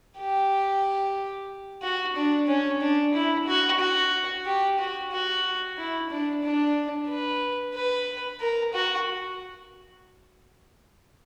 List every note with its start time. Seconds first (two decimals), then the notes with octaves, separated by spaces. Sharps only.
0.18 G4
1.83 F#4
2.16 D4
2.48 C#4
2.81 D4
3.14 E4
3.47 F#4
3.80 F#4
4.46 G4
4.79 F#4
5.12 F#4
5.77 E4
6.10 D4
6.43 D4
7.08 B4
7.74 B4
8.40 A#4
8.73 F#4